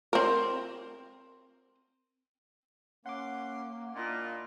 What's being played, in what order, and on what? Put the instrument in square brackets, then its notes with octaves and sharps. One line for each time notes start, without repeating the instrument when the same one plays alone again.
[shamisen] C4 A#4
[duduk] A#3 [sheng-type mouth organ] C#4 C6 [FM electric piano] F#5 D6
[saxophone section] A#2 [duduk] A#3 [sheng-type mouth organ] D4 E4 D#5